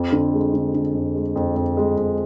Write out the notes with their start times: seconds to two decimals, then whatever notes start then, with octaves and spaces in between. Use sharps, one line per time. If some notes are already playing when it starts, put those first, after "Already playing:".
Already playing: F2
0.12 D3
0.33 G#3
0.54 D3
0.74 D3
0.95 F2
1.15 G#3
1.36 F2
1.56 F2
1.77 G#3
1.97 F2